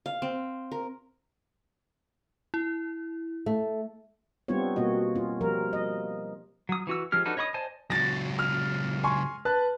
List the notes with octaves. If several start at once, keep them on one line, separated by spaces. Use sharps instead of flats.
F5
C4
A#4
E4
A3
G3 B3 C4 D4 F4 C#5
B2 A#3 F#4 D#5
C#4 F4
F3 G3 A#4
D#5
F#3 D#6
E3 F#4 E6
F3 G#3 G4 F6
D4 D#4 F#4 A4 B4
C#5 D#5 B5 C#6 D#6
C5 D5 D#5 G#5 A5
C#2 F#3 A6 A#6
F6
G#5 C6 C#6
B4 A5 F#6